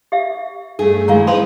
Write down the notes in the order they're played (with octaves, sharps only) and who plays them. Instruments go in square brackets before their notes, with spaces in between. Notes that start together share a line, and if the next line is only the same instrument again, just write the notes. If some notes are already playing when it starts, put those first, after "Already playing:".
[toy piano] G4 E5 F5
[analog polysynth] G2 A3 [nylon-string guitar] G#4
[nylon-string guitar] D#3 E3 G#3 [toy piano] F5 A#5
[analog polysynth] C4 D#6 [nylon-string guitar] E4 B4 [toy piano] F5 B5 C6